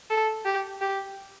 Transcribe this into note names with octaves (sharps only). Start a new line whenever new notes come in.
A4
G4
G4